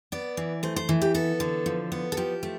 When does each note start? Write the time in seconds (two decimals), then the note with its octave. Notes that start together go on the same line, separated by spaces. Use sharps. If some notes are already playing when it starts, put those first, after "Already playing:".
0.12 B3 D5
0.37 E3
0.63 A3 C5
0.76 C5
0.89 E3
1.01 G4
1.14 B3 A4
1.40 D3
1.66 F3
1.92 B3
2.12 A4
2.17 F3 G4
2.43 A3